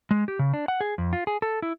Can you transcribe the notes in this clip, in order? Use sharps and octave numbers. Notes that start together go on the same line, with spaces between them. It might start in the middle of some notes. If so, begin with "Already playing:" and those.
G#3
G4
C#3
D4
F#5
G#4
F2
F4
G#4
A4
E4